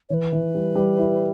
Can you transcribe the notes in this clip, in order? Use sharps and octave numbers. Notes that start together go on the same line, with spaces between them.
E3 B4 C#5
E3
G3
G3
E4